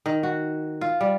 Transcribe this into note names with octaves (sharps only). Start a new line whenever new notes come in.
D#3
F#4
F4
G3